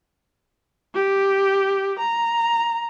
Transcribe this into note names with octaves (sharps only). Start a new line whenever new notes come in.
G4
A#5